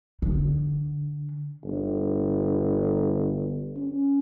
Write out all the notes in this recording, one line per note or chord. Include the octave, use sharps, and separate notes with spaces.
D3
G1
C#4